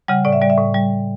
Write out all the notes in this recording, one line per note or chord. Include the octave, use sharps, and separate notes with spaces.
C#3 G3 F#5
A2 D5
E5
G3 D5
E5
A2
G3